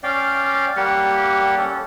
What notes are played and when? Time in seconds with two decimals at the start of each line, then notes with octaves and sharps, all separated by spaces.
0.03 C#4 D5 F5 G5
0.77 G3 A#3 G4 F#5
1.58 C#4 A4